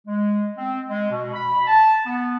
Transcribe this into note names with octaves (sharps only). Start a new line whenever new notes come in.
G#3
C4
G#3
B2
B5
A5
B3